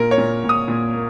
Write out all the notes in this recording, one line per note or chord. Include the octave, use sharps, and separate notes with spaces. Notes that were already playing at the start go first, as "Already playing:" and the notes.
Already playing: A#2 A#4
C#5
A#2
A#2
D#6
A#2
A#3